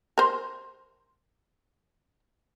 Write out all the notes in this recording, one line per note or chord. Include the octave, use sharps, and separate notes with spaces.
A#4 C5